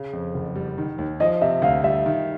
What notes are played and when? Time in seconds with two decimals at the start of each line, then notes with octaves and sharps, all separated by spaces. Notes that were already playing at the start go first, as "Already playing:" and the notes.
Already playing: C#3
0.13 F2
0.34 F#1
0.55 G3
0.78 D#3
0.98 D#2
1.20 F3 D#5
1.41 C3 E5
1.62 D2 F5
1.84 G3 E5
2.06 D#3